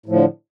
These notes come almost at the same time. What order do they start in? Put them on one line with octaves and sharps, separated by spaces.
A2 F3 D3